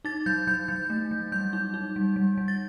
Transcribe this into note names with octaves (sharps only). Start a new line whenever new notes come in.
D#4 A6
F#3 G6
F#3 G6
F#3 G6
A3
F#3
G3 G6
D#4
D#4
G3
G3
G3
A6